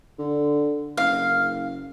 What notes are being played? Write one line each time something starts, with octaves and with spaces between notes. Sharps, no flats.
D3
F#1 F5